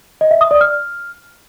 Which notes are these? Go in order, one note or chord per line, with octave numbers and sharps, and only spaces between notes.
D#5
E5
D#6
D5
F6